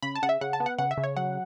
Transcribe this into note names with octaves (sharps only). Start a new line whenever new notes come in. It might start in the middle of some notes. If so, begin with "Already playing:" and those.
C#3 B5
A5
C#3 F#5
E5
C#3 F#5
A5
B3
F#5
C#3 F#5
E5
C#3
C#5
F#3 F#5